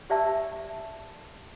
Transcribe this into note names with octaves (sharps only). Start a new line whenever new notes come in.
G4 D5 E5 A5 E6